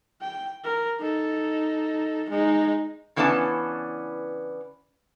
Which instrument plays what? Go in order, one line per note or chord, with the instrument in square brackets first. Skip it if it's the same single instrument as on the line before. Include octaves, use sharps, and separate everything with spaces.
[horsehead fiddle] G5
A#4
D#4 A4
G#3 D#4
[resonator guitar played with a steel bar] C#3 E3 B3 C#4 D4 A5